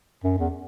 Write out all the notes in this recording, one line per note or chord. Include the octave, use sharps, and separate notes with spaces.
F#2
E2